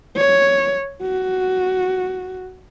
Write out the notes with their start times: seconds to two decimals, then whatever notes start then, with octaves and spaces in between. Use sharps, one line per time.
0.17 C#5
1.04 F#4